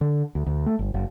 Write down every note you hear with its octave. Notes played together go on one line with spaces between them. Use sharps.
D3
D2
D2
A3
G1
F#1